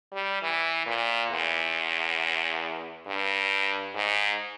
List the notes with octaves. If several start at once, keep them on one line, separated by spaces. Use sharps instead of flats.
G3
E3
A#2
E2
G2
G#2